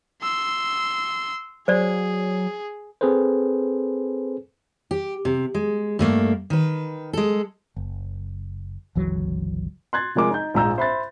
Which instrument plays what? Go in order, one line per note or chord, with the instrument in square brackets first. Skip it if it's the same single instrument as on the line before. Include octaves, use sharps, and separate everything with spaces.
[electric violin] C6 E6
[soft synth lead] F#3 [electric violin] G#4 [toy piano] C5 D5
[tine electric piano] C4 G#4 A4 B4 C5
[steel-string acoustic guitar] G4
C3
G#3
G2 A3 A#3
D#3 B4
G#3 A4
[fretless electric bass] F#1
G1 C#2 E3 F#3
[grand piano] C6 F#6 G#6 A6
C3 F3 G#3 A#4 D6
D#4 G6
A#1 G#2 A#5 E6 G6
C5 E5 B5 C6 F#6 A6